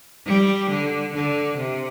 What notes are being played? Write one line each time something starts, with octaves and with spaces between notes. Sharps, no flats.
G3
D3
D3
C3